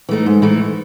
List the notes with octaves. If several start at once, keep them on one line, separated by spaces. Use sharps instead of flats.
E3 A3 D#4
G#2
E3 A3 D#4